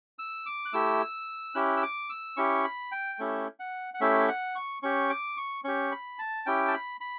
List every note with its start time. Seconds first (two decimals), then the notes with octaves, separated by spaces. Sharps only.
0.19 E6
0.46 D6
0.66 F#6
0.73 A3 E4 G4 E6
1.55 C#4 E4 G4 F#6
1.77 E6
1.82 D6
2.10 E6
2.37 C#4 E4 G4 C#6
2.64 B5
2.92 G5
3.19 A3 C#4 E4 G4
3.60 F#5
3.94 F#5
4.01 A3 C#4 E4 G4 E5
4.28 F#5
4.55 C#6
4.83 C#4 G4 C#6
5.10 D6
5.37 C#6
5.64 C#4 G4 C#6
5.92 B5
6.19 A5
6.46 C#4 E4 G4 G5
6.68 A5
6.74 B5
7.01 B5